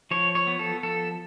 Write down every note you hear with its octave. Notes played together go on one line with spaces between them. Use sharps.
F3 C#5
C#5
B3
A4
F3 A4